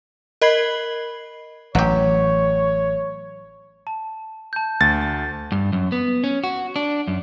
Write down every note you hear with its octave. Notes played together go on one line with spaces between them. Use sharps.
A#4 D#5 B5 G#6 C7 F#7
A1 F#3 G4 C#5
A5
A5 G6
D2 A6
G2
F#2
B3
C#4
F#4
D4
F#2